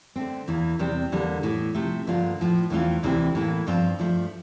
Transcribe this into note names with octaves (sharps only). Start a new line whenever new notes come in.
D3 A3 C4
E2 E3 A#3
E2 C3 G3 C4
E2 D3 G3 A#3
A2 E3 A3
C3 F3 A3
G2 D3 F3 A#3 F4
A2 F3 A3
E2 E3 A3 C4 F4
D2 C3 E3 G3 C4
A2 E3 A#3
G2 F3 C4 F4
G2 F3 A3